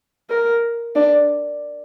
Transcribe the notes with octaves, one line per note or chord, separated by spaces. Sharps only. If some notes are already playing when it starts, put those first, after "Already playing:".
A#4
D4